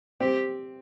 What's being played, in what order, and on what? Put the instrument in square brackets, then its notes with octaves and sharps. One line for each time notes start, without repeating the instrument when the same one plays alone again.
[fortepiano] C4 [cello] G4